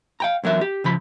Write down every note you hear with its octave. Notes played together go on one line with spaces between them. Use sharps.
F5 G5 A#5
E2 F#3 A#4 E5
G4
C#3 F3 B5